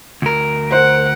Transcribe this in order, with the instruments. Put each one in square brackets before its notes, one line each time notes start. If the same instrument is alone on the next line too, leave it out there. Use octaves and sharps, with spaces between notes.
[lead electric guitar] D2 A#4
[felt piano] C5 [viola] F#5